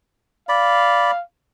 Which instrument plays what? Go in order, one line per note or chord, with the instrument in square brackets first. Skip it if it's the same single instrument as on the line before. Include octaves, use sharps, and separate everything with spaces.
[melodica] D5 B5 [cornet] F5